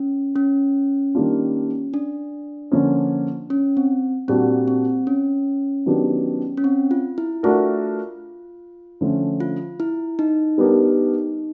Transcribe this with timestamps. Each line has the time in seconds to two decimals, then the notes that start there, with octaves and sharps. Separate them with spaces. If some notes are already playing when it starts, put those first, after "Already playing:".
Already playing: C#4
0.36 C#4
1.15 D#3 G3 A#3 D4 F4
1.94 D4
2.72 D3 F3 A#3 C#4
3.50 C#4
3.77 C4
4.28 A#2 G3 A#3 C4 D4 F#4
4.68 C4
5.07 C#4
5.86 D#3 F#3 B3 D4 G4
6.57 C#4
6.64 C4
6.91 F4
7.18 E4
7.43 A3 D4 F4 F#4 A#4
9.01 D3 F3 A3 C#4
9.40 F4
9.80 E4
10.19 D#4
10.58 G3 B3 D4 G4 A#4